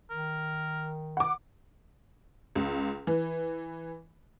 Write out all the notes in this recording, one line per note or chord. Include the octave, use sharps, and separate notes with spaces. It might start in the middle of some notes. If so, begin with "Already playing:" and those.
D#3 A#4
F#5 D6
C#2
E3